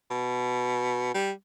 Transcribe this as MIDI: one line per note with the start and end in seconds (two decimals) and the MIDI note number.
0.11 1.13 47
1.15 1.31 55